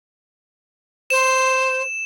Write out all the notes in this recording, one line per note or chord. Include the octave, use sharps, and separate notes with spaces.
C5 E7